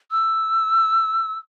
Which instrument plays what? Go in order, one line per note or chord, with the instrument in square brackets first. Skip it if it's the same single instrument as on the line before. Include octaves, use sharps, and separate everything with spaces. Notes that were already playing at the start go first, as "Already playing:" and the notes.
[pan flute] E6